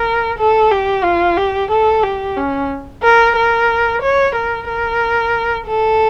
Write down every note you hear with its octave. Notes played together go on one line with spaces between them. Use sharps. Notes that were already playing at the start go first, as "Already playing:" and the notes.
Already playing: A#4
A4
G4
F4
G4
A4
G4
C#4
A#4
A#4
C#5
A#4
A#4
A4